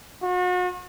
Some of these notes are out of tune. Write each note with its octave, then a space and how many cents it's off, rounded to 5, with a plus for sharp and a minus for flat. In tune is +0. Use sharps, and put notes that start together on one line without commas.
F#4 -40